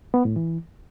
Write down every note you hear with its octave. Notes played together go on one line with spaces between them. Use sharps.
B3
A2
E3